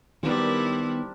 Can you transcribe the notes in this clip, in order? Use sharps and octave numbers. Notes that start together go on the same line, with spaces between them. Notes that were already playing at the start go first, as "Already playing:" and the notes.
D#3 G3 B3 C4 D4 E4 A#4